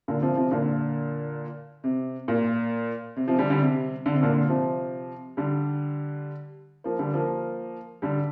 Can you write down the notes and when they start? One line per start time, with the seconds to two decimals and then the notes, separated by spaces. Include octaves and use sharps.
0.08 A#2 D3
0.22 C3 F3
0.37 C3 F3
0.51 A#2 D3
1.84 C3
2.28 A#2
3.16 C3
3.27 C3 F3
3.38 D3 G3
3.50 D3 G3
3.62 C3
4.06 D3
4.14 C3
4.23 A#2 D3
4.49 C3 F3
5.37 D3 G3
6.84 F3 A#3
6.99 D3 G3
7.14 F3 A#3
8.02 D3 G3